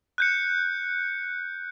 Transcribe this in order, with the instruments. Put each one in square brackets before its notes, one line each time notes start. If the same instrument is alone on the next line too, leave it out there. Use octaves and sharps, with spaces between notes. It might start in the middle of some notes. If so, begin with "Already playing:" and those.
[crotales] F#6 G6 C#7